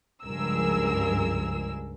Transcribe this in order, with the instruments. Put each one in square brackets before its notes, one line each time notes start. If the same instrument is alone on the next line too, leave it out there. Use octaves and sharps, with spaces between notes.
[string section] C#2 G2 F3 G#4 A#4 E6